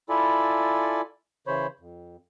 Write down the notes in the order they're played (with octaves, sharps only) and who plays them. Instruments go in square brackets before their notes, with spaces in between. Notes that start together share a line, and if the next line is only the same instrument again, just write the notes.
[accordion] E4 F4 A4 D5 G#5 B5
C#3 E3 C5 C#5 B5
F2